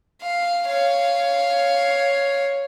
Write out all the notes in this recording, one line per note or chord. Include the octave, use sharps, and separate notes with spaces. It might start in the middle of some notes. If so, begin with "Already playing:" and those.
F5
C#5 F5